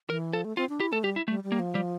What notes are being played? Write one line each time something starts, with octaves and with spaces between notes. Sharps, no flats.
E3 A#4
F3 A4
A3
C4 F4
D4
E4 G4
A3 A4
G3 G4
E4
G3 A3
G3
A#3
F3
G3